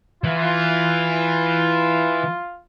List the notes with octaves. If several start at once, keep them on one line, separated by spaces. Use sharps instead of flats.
E3 F4